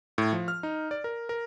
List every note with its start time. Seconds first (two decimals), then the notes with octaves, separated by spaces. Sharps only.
0.18 A2
0.33 F3
0.48 F6
0.63 D#4
0.91 D5
1.04 A#4
1.29 A#4